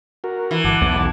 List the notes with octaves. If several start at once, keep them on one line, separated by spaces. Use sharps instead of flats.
F#4 A#4
E3
G1 F#5 A5 D6
B1 E2